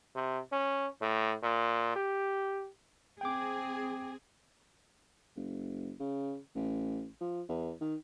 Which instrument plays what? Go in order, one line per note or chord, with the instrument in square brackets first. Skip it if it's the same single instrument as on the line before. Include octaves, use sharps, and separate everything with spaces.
[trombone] C3
C#4
A2
A#2
G4
[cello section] C4 G#4 [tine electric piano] G5 D6
[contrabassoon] F#1
C#3
A1
F3
E2
D#3